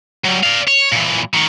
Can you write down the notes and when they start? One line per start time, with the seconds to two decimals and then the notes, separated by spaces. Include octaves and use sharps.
0.24 F#3 G3
0.43 D5 F5
0.68 C#5
0.92 A#2 E3
1.34 D#3 F#4